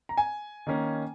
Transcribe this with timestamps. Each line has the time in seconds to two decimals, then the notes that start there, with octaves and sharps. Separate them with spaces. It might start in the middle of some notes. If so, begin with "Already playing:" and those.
0.09 A#5
0.18 G#5
0.67 D#3 A#3 C#4